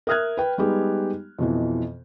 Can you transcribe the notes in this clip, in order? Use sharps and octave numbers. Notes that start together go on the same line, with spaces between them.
A#4 E5 D#6 F6 F#6 G#6
B4 G5
G3 G#3 B3 D#4 G4
F2 B2 E3